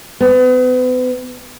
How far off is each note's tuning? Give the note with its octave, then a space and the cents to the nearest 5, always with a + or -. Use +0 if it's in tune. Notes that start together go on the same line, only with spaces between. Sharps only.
B3 +40